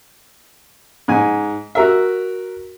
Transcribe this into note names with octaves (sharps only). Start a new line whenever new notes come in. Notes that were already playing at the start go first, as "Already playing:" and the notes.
G#2 G#5
F#4 A#4 E5